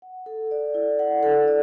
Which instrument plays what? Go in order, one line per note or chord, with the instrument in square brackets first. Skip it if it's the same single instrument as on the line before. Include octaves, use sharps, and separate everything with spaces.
[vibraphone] F#5
A4
D5
E4
F#5
A4
D5